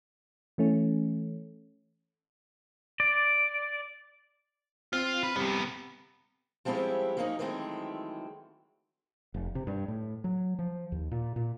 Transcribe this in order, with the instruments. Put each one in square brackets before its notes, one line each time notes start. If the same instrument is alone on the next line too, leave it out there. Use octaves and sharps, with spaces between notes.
[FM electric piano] E3 A3 C#4
[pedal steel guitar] D5
[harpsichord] C4 [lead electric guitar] F4
[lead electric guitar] B4
[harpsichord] C2 [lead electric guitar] C3 B3
[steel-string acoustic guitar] F3 G3 G#3 C4 C#4 E4
F3 F#3 A#3 B3 C#4 D#4
D#3 E3 F#3 G#3 A3 C4
[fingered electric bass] F1
C3
G2
A2
F#3
F3
D#2
A#2
A#2